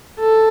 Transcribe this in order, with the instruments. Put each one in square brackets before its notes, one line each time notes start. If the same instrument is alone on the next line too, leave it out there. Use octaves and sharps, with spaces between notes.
[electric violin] A4